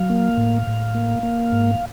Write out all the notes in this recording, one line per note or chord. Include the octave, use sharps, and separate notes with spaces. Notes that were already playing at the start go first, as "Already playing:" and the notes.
Already playing: F#3 F5
A#3
A2
A2
A#3
A#3
G#2